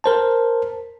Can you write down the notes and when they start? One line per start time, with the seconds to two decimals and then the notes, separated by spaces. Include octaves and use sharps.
0.04 A#4 C5 A5